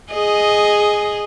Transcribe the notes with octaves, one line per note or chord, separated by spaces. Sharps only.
G#4 D#5